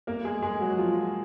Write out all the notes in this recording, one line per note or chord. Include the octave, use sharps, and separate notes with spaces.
A#3 A#4
G#3 G#4
G#3 G#4
F#3 F#4
F3 F4